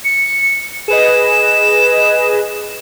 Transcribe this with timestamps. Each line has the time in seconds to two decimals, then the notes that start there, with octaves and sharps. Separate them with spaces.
0.04 C#7
0.88 G#4 B4 D#5 E7